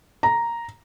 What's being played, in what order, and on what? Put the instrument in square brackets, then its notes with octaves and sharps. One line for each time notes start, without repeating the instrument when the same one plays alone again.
[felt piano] A#5